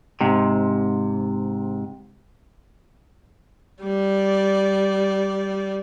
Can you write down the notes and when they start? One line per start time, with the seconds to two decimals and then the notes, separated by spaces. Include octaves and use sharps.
0.21 G#2 C3
3.83 G3 D5